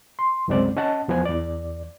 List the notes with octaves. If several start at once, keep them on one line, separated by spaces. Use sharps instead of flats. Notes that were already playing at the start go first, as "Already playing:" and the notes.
C6
C2 F#2 C#3 G#3 C4 D5
C#4 D#5 F#5 A5
E2 F3 B3 G#5
E2 D5